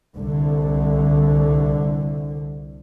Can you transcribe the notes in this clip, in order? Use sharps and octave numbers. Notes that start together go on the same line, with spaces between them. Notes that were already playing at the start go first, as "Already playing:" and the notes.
C2 D3